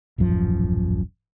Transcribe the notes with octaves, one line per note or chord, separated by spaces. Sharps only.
D#1 A1 F#2 F3